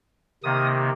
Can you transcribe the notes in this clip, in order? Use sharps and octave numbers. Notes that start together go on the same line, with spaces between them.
C3 D#3 A#3 D#6